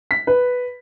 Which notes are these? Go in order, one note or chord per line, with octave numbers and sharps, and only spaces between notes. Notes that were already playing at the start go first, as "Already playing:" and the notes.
B6
B4